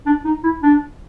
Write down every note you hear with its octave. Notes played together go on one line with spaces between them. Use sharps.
D4
D#4
E4
D4